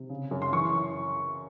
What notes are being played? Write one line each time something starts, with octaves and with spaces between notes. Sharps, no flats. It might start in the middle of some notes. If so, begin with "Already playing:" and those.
Already playing: C3
C#3
F#2
C6
E3 C#6